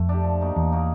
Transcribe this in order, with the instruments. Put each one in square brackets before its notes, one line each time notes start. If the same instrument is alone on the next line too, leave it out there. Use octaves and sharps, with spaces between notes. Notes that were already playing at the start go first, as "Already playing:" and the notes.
Already playing: [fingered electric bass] F2 [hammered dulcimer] A3
[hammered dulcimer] D4 G4
F3
A#3 D#4 F#4
[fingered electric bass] E2 [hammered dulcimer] F3
[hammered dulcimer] A#3 D#4 F#4